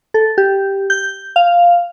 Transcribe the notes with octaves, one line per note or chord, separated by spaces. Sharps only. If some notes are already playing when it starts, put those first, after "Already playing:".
A4
G4
G6
F5